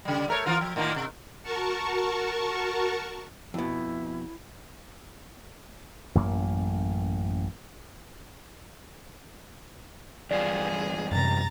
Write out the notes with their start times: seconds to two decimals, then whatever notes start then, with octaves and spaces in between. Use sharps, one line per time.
0.05 C#3 G3
0.28 A3 A#4 C#5
0.46 E3 F4 A#4
0.61 F3
0.76 A2 D#3 A#3
0.96 C3
1.43 F#4 A#4 A5 C#6
3.54 F2 B2 E4
6.15 A1 F#2 A#3
10.31 E2 G2 F4 G#4 D5
11.11 F#2 C3 A#5 A6